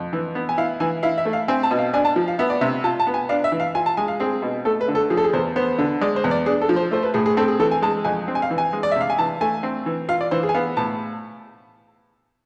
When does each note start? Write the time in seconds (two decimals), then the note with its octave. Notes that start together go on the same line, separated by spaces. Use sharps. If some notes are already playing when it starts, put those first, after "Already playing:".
Already playing: F2
0.13 E3
0.35 B3
0.49 G#5
0.58 E4 F5
0.80 E3 G#5
1.03 E4 F5
1.18 E5
1.25 A3
1.33 F5
1.48 C4 G#5
1.63 A5
1.71 B2
1.79 F5
1.93 D4 G#5
2.05 A5
2.16 F3
2.28 F5
2.39 B3 E5
2.50 D5
2.61 C3 E5
2.84 F4 A5
3.00 A5
3.07 B3
3.14 G#5
3.29 D4 F5
3.44 E5
3.52 E3
3.60 F5
3.75 F4 G#5
3.86 A5
3.97 G#3 G#5
4.08 F5
4.20 C4 G#4
4.42 B2
4.65 A3 A4
4.81 B4
4.88 D3
4.95 A4
5.10 F3 G#4
5.17 A4
5.24 G#4
5.33 E2 C5
5.56 B3 C5
5.78 D3
6.01 G#3 D5
6.16 C5
6.24 E2
6.31 D5
6.46 D4 G#4
6.61 A4
6.69 F3
6.76 C5
6.91 A3 C5
7.03 B4
7.14 A2 G#4
7.26 G#4
7.37 C4 A4
7.48 G#4
7.59 E3 A4
7.71 G#5
7.82 G#3 A5
8.05 F2 G#5
8.28 C4
8.35 G#5
8.42 F5
8.50 E3
8.58 G#5
8.73 G#3
8.83 D5
8.92 E5
8.96 C3
9.01 F5
9.10 G#5
9.18 E3 A5
9.41 A3 G#5
9.63 C4
9.86 E3
10.09 F4 F5
10.21 D5
10.31 E3 C5
10.43 G#4
10.49 G#5
10.54 B3 F5
10.77 A2 A5